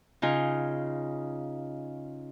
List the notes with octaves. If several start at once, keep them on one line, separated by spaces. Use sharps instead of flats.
C#3 D#4 F4 G#5